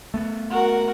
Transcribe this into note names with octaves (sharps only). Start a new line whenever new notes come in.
A3 B3
F#4 A#4 F#5